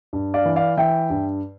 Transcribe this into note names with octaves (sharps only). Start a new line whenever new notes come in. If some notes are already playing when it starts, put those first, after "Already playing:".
G2
D5 F5
E3
D5 F5
E3 E5 G5
G2